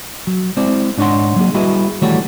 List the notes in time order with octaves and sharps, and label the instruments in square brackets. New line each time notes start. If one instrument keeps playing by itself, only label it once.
[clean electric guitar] F#3
G#3 C4 E4 C5 D5
G#2 D4 D#4 C#5 F#5 C6
F#3 A#3 G#4
G3 E4 F#4 G#4 B4 D#5
D#3 E3 G3 A3 F#4 C#5